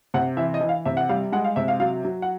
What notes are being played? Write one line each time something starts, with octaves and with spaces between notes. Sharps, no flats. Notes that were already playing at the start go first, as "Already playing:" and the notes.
C3 F#5
E3 E5
D#5
E3
F5
C3 E5
F#5
G3 F5
G#3 F#5
F5
C3 E5
F5
F#3 F5
F#3
F#5